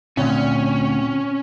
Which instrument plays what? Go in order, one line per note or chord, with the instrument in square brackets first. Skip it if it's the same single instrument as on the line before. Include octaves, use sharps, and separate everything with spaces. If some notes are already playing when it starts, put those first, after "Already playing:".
[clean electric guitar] D2 [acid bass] A#2 [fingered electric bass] C4 [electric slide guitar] C#4